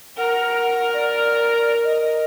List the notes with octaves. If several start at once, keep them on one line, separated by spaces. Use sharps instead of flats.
A#4 F#5
D5
D#5